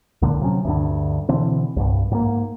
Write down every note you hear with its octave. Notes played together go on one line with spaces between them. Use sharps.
C#2 A#2 D3
C3 F#3 C#4
D2 G2 D3
B2 D3 E3 C4
C2 G2
G#2 A#3